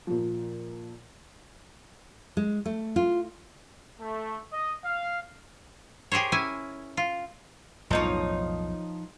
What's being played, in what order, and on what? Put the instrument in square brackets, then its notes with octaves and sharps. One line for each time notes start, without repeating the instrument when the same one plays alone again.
[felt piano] A#2 F3
[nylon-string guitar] G#3
A3
F4
[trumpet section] A3
D#5
F5
[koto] G4 G#4 A#4 C5 C#5
C#4 E4 G#5
F4
[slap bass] B1 F2 A2 [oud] F3 D#4 C#5